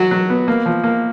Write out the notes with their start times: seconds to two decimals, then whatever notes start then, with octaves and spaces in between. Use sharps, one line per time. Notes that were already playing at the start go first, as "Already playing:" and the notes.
Already playing: F#3 F#4
0.11 F#3
0.30 B3
0.48 A#3
0.66 F3
0.84 A#3